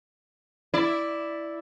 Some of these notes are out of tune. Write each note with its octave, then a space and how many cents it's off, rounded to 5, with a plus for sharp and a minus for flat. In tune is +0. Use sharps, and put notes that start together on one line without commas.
E4 +0 D5 +0